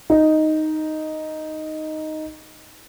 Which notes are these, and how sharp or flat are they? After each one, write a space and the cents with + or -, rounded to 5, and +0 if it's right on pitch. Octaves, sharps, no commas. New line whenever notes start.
D#4 +0